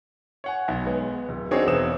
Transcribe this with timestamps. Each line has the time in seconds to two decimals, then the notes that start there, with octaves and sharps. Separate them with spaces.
0.44 C#5 F#5 G#5
0.68 B1
0.85 G#3 B3
1.29 D1
1.51 C4 D4 D#4 F#4 G#4 C#5
1.66 E1 B3 C4 D#6 E7